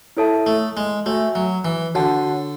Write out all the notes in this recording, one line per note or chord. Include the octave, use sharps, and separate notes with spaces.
E4 A4 C#5 E5 A5
A3
G#3
A3 F#4 C#5 E5 G#5
F#3
E3
D3 F#4 C#5 F#5 A5